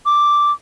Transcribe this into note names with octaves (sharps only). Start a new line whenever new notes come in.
D6